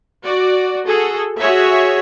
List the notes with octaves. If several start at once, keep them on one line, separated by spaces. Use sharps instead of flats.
F#4 D5
F#4 G#4 A4
F#4 G#4 C#5 E5